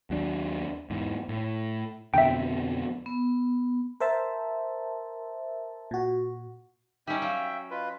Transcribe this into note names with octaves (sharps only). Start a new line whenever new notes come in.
D#2 F#3 D4
E2 G#2
A2
F2 B2 D3 E5 G5
B3
A#4 C5 E5 A5
A#2 F#4
G3 C#4 D#4 E5 G5
F#3 F5
F4 B4 D#5